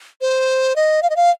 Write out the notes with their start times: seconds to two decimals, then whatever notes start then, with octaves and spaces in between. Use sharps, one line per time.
0.21 C5
0.76 D#5
1.03 F5
1.10 D#5
1.16 F5